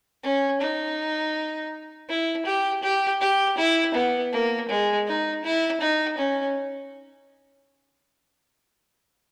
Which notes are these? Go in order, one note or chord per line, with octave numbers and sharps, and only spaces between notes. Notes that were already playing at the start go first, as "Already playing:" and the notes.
C#4
D#4
E4
G4
G4
G4
E4
B3
A#3
G#3
D#4
E4
D#4
C#4